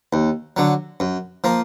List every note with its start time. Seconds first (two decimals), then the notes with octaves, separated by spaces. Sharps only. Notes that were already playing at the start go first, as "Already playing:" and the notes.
0.13 D#2
0.57 D3 F#3
1.00 F#2
1.44 F3 A#3